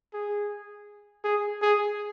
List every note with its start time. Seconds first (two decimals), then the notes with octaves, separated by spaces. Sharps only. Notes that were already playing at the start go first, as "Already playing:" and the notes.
0.14 G#4
1.24 G#4
1.62 G#4